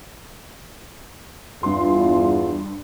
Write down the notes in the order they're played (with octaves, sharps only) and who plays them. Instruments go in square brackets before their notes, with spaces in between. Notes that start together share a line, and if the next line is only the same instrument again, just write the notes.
[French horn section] E2 F4 [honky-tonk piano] G2 C6